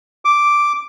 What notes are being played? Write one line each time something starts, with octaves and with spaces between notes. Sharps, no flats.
D6